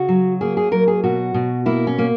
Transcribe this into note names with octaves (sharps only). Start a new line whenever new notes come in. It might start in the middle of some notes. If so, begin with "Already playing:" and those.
Already playing: C#3 F#4
F#3
A#3 G#4
G#4
F#3 A#4
G#4
B2 F#4
B2
A#3 E4
C#4
A#3